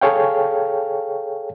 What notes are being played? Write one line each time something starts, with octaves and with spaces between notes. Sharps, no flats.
G#4 A4 C#5 F5 G5